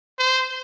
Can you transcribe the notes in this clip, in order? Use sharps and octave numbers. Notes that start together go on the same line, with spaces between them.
C5